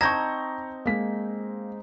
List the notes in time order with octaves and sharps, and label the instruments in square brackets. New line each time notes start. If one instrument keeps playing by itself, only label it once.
[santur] C4 D#4 [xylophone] A5 G#6 [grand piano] A#5 C#6 [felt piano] G6 A#6
[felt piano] G#3 [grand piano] A#3 B6